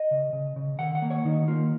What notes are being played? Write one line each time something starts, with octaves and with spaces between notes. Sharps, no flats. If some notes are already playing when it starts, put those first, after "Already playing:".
Already playing: D#5
C#3
C#3
C#3
D#3 F#5
F#5
A#3
C#5
D#3 D#4
A#3 F4